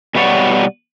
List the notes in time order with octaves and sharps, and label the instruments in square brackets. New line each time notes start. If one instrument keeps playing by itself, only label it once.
[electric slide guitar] B2 G3 B4 C#5 D5 F#5